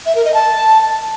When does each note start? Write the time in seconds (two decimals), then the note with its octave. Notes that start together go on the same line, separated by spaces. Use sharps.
0.06 E5
0.15 A#4
0.25 D#5
0.34 A5